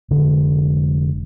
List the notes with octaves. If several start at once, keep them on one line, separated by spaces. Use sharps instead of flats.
F1 D3 G#3